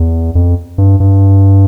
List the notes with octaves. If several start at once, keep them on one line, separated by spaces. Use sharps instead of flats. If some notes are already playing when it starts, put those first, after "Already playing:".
Already playing: E2
F2
G2
G2